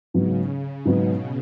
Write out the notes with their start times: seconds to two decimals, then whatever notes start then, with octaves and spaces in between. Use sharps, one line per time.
0.14 G#2 C#3 F#3 B3
0.50 C#3
0.85 G#2 B2 F#3 B3